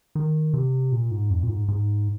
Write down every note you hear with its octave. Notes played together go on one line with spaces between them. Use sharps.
D#3
C3
A#2
G#2
F2
A#2
G#2
G#2